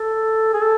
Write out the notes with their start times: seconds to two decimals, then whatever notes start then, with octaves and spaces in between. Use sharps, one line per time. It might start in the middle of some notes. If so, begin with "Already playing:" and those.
Already playing: A4
0.53 G#4
0.61 A4